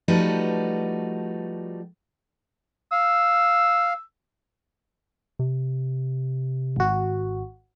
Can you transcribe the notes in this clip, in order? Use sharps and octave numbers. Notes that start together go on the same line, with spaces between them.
F3 G3 A3 D#4 F#4 B4
F5 E6
C3
G#1 F#4